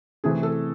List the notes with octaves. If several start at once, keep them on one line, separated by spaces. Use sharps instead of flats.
C3 E3 A3 C4 G#4
A4